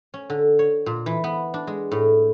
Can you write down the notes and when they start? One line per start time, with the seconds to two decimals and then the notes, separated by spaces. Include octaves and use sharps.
0.14 C#4
0.30 D3
0.59 C#5
0.86 A#2
1.06 E3
1.24 B3
1.54 D4
1.67 G#3
1.92 A2